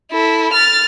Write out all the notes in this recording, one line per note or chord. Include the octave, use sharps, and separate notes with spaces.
E4 A4
F6 A6